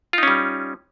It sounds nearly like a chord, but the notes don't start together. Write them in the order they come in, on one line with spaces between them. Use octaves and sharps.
F4 D#4 C#4 G3